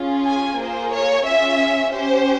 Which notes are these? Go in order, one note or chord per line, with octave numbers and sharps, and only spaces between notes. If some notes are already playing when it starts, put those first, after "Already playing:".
Already playing: C#4 F4 G#4
G#5
A#3 F4 G#4 C5
C#5
C#4 F4 G#4 E5
C#4 G4 C5